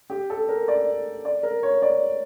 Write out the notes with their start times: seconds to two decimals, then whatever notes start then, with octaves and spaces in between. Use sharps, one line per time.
0.10 G4
0.30 A4
0.48 A#4
0.68 D5
1.25 D5
1.43 A#4
1.63 C#5
1.82 D5